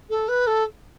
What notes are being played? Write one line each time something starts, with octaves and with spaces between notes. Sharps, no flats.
A4
B4
A4